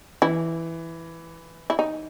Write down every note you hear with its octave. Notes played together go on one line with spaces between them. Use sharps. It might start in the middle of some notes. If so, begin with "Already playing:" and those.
E3 E4
E4
D#4